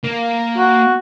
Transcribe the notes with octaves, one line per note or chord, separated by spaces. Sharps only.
A#3
F#4